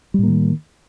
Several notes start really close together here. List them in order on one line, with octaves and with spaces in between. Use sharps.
G3 A2 A#3 D#3